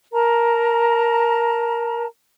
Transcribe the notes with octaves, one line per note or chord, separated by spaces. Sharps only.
A#4 A5 A#5